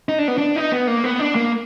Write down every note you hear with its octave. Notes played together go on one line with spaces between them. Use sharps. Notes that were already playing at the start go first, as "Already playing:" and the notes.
D#4
D4
B3
D4
D#4
B3
A#3
B3
D4
A#3